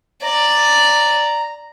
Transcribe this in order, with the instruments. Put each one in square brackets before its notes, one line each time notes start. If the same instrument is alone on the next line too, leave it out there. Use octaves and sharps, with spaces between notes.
[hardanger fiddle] D5 [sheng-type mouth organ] A#5